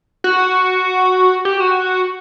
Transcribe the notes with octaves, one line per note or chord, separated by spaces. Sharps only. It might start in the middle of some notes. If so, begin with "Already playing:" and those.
F#4
G4
F#4